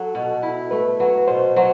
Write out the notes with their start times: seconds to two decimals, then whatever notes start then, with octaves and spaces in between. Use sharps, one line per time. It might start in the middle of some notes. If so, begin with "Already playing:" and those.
Already playing: F#3 A4
0.15 B2
0.43 E4
0.71 A3 B4
1.00 F#3 B4
1.28 B2 C5
1.56 F#3 C5